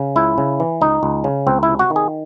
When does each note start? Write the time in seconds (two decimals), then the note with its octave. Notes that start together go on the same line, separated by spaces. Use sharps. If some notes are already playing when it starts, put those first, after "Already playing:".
Already playing: C#3
0.16 C#2 E4
0.38 C#3
0.60 E3
0.81 C#2 D#4
1.03 C#2
1.24 C#3
1.47 C#2 C4
1.63 E4
1.68 C3
1.79 F#4
1.90 D#3
1.96 G#4